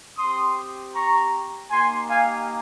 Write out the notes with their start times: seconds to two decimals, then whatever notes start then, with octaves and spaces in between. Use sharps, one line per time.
0.17 C4 G4 C6 D#6
0.94 A#5 C#6
1.70 A#3 D#4 G4 G#5 C6
2.08 F5 G#5